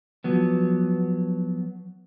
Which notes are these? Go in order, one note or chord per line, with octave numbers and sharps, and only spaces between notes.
F3 F#3 B3